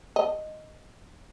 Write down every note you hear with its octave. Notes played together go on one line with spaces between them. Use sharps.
D#5